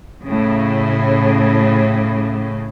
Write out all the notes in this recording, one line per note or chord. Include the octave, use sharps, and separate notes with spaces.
A2 C#3